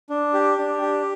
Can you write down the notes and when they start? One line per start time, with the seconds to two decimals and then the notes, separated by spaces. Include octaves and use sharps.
0.10 D4
0.34 G4
0.58 D4
0.82 G4